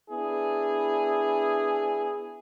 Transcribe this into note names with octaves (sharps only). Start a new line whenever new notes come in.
B3 D4 E4 G#4